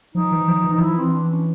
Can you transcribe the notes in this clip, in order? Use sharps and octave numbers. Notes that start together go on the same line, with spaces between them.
F3 D#4
E3
F3
E3
D#4
F3 E4
E3
C4
D4
C#4